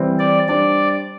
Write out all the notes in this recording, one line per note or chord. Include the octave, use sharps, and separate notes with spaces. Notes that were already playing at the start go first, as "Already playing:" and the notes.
Already playing: E3 G3 C4
D5
G3 D4 C5 D5